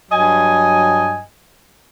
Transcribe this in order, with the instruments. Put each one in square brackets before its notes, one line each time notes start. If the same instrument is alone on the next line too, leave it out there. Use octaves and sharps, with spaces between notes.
[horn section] G2 F#3 D#5 G#5